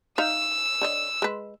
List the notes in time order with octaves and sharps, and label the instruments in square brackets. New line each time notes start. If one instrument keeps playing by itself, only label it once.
[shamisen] D#4 E5 F5 [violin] E6
[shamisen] D3 C#5 D#5
G#3 B4